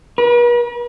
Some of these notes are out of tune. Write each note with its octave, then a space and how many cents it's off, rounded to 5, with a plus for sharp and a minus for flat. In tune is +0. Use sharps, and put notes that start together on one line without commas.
B4 -45